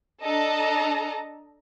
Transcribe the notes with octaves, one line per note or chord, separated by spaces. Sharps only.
D4 A4 D#5 A5 A#5